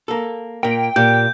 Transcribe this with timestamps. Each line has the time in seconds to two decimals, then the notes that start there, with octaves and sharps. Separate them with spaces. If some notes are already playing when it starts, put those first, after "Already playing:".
0.08 A#3 A4
0.63 A#2 A#3 G5
0.96 A#2 G4 G6